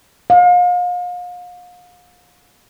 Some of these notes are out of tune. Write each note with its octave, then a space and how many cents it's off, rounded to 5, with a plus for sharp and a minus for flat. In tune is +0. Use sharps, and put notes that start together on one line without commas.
F5 +35